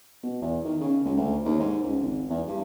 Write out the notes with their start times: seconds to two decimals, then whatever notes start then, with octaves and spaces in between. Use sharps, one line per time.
0.23 B2
0.42 E2
0.65 D#3
0.81 C#3
1.05 C#2
1.17 D2
1.45 D#2
1.60 G#2
1.83 C#2
2.02 G#1
2.29 E2
2.48 G2